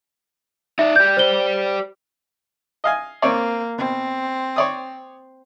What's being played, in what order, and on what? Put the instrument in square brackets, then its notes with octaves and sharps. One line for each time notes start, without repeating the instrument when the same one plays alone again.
[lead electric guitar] D#4 D5 [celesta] E5
[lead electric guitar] G4 D5 [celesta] G6
[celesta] C5 G7
[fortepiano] D#5 F5 G#5
[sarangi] A#3 [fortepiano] C4 C#5 D5
[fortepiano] B2 [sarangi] C4
[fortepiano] C#5 D5 D#6